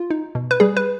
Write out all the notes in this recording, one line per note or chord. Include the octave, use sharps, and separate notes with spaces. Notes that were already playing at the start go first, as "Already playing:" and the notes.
Already playing: F4
D#4
B2
B4
G3 G#4
B4